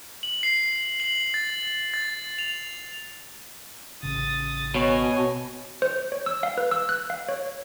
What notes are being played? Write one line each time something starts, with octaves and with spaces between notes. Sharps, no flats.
F#7
C7
F#7
A6
A6
F7
A1 C#3 D#6 A6
B2 C#5 D#5 G#5
C5
C#5
E6
F5
B4
E6
F#6
F5
C#5